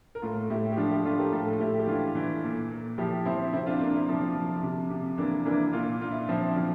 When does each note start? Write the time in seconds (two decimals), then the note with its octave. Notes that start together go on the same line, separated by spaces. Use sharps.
0.15 A#4
0.22 A2 F4 A4
0.50 A2 E4 G4
0.72 G4
0.77 F3 D4 F4
0.91 E4 G4
1.05 F3 F4 A4
1.19 G4 A#4
1.32 A2 F4 A4
1.53 A4
1.60 A2 E4 G4
1.79 G4
1.87 E3 D4 F4
2.15 E3
2.43 A#2
2.71 A#2
2.98 F3 E4 G4
3.25 F3 C4 E4
3.53 C3 C4 E4
3.66 D4 F4
3.80 C3 A#3 D4
3.95 C4 E4
4.09 F3
4.35 F3
4.63 C3
4.90 C3
5.18 E3 A#3 D4
5.45 E3 A#3 D4
5.73 A#2 D4 F4
6.01 A#2 F4
6.11 E4
6.20 D4
6.29 F3 C4 E4
6.56 F3